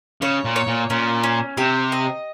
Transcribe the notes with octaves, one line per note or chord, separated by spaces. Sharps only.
C#3 C#5
A#2
C#5
A#2
A#2 C#4
C#4
C3 G4
D#5